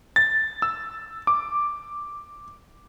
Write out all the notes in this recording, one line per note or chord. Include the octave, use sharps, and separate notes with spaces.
A6
E6
D6